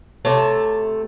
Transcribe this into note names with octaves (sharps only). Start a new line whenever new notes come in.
C3 A3 A4 C#5